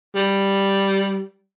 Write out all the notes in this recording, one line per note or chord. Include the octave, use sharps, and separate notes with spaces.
G3